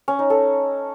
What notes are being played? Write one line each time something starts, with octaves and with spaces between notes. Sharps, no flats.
C#4
D#4
A4